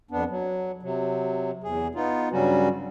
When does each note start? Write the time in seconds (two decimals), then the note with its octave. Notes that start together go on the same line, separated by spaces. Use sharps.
0.11 F2 B3 D4
0.30 F#3
0.83 C3 F#3
1.64 E2 G#4
1.95 B3 D#4 F4
2.32 G2 C#3 F#3 G3 C#4 F#4